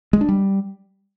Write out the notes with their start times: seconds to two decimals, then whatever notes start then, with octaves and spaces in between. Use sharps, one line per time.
0.13 G#3
0.21 D4
0.29 G3